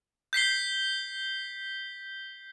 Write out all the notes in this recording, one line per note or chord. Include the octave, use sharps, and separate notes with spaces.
G6 B6 C7 G7